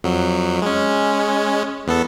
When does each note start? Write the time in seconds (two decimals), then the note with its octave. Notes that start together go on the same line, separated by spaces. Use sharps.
0.04 F2 F#3
0.62 G#3 C#4
1.87 E2 B3 A4